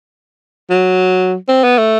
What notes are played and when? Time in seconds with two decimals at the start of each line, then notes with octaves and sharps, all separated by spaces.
0.70 F#3
1.48 C4
1.64 B3
1.78 A3